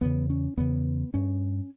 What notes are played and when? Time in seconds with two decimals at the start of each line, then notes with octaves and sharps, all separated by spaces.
0.01 E2 C#3 B3
0.30 C#4
0.57 E2 C#3 B3
1.14 G2 C#4